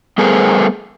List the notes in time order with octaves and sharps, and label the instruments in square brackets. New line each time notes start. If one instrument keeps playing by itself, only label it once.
[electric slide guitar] G3 A3 B3 G#4 A#4 C5